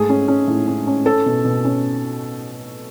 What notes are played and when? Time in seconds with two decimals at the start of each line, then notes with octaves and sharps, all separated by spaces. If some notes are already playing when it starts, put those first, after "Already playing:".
Already playing: G#2 A3 G#4
0.09 C#4
0.28 C#4
0.48 A2
0.67 C#4
0.87 C#4
1.05 C#4 A4
1.26 B2
1.45 B2
1.64 C#4